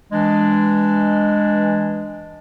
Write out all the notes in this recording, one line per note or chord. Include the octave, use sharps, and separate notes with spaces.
E3 G#3 D4